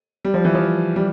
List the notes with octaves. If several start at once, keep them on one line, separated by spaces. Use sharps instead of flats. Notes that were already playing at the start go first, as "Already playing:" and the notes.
G3
F3
E3
F3
G3